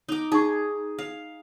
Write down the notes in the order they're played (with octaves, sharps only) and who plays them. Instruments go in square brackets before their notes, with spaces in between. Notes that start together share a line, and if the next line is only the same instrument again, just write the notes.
[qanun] D#4 D6
[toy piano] D#4 C#6 [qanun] G#4
[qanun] F5